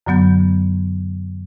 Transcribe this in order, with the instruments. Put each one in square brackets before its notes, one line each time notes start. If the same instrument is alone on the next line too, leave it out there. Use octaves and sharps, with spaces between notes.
[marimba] F#2 D3 F#3 B3 G6